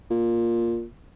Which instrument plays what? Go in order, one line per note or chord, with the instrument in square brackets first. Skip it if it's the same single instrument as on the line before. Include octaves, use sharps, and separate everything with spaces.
[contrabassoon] A#2